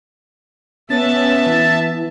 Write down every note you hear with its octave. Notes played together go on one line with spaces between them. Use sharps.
B3 C#4 E5 A5 A6
E3